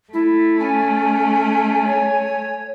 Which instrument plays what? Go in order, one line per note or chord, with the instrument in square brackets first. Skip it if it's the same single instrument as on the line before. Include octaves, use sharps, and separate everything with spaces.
[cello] A3 [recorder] E4
[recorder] C#4 [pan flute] G#5
[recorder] C#5